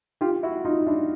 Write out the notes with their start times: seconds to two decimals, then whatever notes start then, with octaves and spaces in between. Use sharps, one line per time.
0.21 F4 G4
0.43 E4 F#4
0.65 D#4 F4
0.87 D4 E4